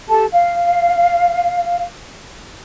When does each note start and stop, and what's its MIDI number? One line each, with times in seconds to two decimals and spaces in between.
0.09 0.24 67
0.09 0.24 69
0.09 0.24 81
0.32 1.85 77